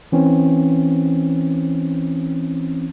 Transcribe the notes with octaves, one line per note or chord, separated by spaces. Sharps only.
E3 C4 C#4